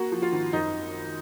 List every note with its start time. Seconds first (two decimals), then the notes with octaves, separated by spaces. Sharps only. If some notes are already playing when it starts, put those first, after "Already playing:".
Already playing: A#3 F#4
0.12 F3
0.22 F4
0.32 G#1
0.53 F#2 D#4